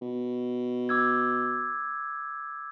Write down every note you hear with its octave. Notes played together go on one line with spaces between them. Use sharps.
B2
D6 E6 G#6